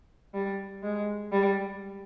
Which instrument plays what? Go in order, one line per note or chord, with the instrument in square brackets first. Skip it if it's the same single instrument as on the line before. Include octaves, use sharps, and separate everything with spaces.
[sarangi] G3
G#3
G3